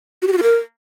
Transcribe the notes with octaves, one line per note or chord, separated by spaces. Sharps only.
F#4
G4
F#4
F4
A#4